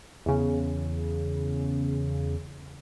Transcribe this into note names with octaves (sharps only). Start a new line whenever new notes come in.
E2 C#3